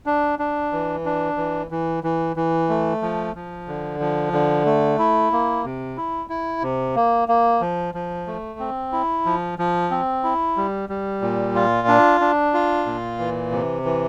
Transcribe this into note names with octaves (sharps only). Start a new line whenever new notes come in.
D4
D4
E3
D4
E3
E3
E3
E3
A3
F3
F3
D3
F3
D3
A3
E4
A#3
C3
E4
E4
C3
A#3
A#3
F3
F3
A3
C4
E4
F3
F3
C4
E4
G3
G3
A#2
F4
D4
D4
F4
A#2
E3
C3
E3